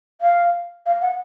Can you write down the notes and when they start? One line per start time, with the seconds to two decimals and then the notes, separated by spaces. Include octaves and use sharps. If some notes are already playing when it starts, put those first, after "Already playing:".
0.21 F5
0.86 F5
1.01 F#5